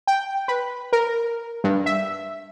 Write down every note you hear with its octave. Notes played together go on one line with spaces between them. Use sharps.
G5
B4
A#4
G2
E5